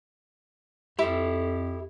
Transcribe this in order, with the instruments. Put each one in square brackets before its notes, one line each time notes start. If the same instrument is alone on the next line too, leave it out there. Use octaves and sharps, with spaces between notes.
[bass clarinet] F2 [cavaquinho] E4 [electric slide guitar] G4 A4